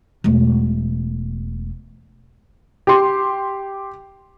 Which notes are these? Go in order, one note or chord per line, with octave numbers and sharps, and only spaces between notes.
E1 A3
G4 C6